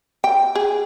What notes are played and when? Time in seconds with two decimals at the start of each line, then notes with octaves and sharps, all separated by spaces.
0.24 G5
0.55 G#4